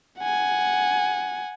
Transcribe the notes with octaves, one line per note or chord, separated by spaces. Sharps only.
F#5 G#5